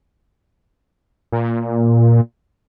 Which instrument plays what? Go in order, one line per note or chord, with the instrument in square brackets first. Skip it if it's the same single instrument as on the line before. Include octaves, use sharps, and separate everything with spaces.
[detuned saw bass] A#2